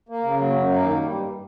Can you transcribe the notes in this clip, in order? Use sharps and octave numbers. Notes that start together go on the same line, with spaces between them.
A#3
C#3
F#3
F#2
A#3
D#3
G3
G2